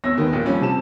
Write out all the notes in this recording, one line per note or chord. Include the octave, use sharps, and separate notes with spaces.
E2 C#5 E6 A#6
D#2 D#3 B3
A#1 A#2
F3 G3 C#4
C3 A5 E7